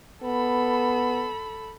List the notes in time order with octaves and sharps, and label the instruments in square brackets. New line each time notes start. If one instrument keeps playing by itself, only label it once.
[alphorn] B3 [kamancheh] A4 B5